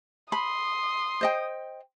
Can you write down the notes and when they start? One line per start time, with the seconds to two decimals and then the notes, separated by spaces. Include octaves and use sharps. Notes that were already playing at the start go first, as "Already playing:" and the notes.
0.32 B5 C6 D#6
1.21 C5 D#5 G5